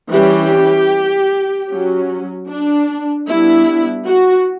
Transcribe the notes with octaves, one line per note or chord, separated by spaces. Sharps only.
E3 G3 C#4 G4
F#3 C#4
D4
G3 B3 D4 E4
F#4